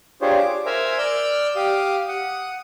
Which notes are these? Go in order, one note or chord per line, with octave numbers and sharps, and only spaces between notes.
D4 F4 G4 G#4 C5 C#5
D6
A#4 C5 E5 G#5 A#5
D5 E6 F6 G6
G4 F5 D6 D#6
F#5 D#6